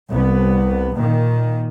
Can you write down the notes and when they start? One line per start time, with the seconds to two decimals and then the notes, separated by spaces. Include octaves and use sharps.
0.10 C2 B3
0.96 A#2 D#3